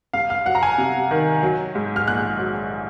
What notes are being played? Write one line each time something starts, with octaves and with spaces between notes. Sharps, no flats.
C2 F5
F5
F#3 F#5
A#5
G#5
C3
D#3
F#3
G#2
F6
A#1 F#6
F#3